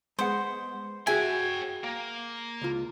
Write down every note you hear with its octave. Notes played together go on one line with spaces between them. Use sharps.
G#3 B3 C5 F#5
F#4 G#4 C#5 E5 G5 G#5
A#3
C#2 F4